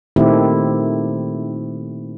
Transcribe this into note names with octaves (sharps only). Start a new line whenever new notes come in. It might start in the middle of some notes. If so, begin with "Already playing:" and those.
A#2 D#3 A3 C4 E4 G4